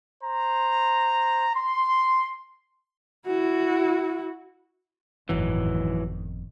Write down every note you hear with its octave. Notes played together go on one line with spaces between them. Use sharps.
C5 A#5
C6
E4 F#4
G1 F2 A2 D#3 E3 F#3